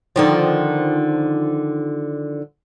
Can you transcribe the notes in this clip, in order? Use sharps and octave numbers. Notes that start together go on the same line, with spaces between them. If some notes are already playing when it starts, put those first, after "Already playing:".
D3 D#3 F3